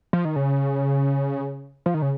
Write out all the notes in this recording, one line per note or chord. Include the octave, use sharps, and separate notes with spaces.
F3
D#3
C#3
F3
D#3
C#3